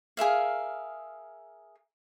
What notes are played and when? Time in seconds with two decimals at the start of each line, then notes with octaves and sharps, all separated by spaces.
0.17 G#4 A#4 E5 F5